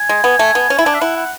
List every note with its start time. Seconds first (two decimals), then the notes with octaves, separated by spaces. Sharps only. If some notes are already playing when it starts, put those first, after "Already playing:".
Already playing: G#5
0.09 G#3
0.24 B3
0.39 A3
0.55 B3
0.70 C#4
0.79 E4
0.86 D4
0.94 E5
1.01 E4 F#5
1.16 F#5